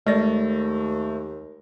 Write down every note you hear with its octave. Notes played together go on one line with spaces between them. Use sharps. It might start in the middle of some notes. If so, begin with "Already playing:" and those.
D#2 G#3 A3 D5 A#6